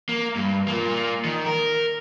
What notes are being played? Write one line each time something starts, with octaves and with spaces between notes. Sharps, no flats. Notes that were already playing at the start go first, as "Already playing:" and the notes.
A#3
G2
A#3 F4
D#3
A#4